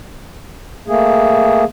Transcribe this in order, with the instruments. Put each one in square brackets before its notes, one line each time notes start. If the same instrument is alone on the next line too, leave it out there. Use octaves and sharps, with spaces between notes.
[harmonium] A3 A#3 G#4